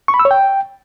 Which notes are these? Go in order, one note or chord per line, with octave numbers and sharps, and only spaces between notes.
C#6
B5
E6
C#5
G5